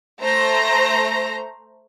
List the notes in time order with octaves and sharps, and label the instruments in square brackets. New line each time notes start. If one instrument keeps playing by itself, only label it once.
[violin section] A3 C5 A#5 A#6